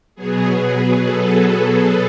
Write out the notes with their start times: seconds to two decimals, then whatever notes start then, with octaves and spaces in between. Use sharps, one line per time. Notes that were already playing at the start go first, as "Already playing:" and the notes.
0.15 B2 F#3 B3 G#4
0.59 G#4
1.01 A4
1.44 G#4